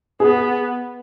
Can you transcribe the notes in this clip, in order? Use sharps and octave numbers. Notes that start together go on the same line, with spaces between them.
B3 G#4